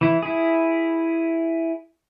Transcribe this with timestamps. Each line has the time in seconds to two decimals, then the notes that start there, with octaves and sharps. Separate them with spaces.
0.01 E3 E4
0.22 E4 G#4